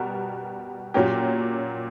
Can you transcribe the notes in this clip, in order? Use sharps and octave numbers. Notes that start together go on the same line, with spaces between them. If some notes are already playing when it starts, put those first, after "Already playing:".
Already playing: B2 G3 B3 F#4 A#4
A#2 F#3 A#3 C#4 G4